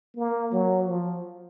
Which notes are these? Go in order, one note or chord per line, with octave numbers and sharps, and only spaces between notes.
A#3
F#3
F3